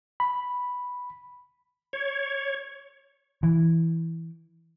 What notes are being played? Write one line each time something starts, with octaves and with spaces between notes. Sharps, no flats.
B5
C#5
E3